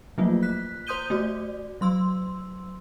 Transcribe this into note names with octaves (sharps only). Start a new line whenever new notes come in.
F3 F#3 A3 A#3 F4
F#6 B6
C5 C6 D#6 G6 D#7 G7
A3 F#4 D5
F#3 C6 E6